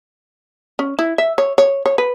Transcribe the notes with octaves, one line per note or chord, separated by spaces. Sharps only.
C#4
E4
E5
C#5
C#5
C#5
B4